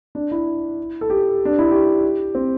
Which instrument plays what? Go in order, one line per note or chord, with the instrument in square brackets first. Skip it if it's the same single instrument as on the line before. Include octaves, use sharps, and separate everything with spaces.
[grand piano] D4
E4
A4
G4
D4
E4
G4
C4